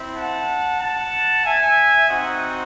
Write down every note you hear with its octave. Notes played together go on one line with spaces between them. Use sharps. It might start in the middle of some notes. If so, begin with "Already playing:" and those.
Already playing: C4 E4
F#5 A5
F#5 A5
E5 G#5
C4 D#4 F#4 D#5 F#5